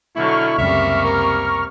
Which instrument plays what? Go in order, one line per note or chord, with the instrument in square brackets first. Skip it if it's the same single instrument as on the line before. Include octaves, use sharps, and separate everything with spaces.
[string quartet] B2 D3 F#3 [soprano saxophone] E4 [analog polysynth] C#6 F6
[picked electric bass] C#2 F#2 [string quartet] C3 G3 A#3 [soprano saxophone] E5
[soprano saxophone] A#4